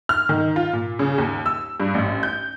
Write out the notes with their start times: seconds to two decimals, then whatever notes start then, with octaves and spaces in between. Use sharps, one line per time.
0.09 F6
0.29 D#3
0.56 F4
0.73 A#2
0.99 C#3
1.18 D#2
1.46 E6
1.80 G2
1.95 A1
2.23 G6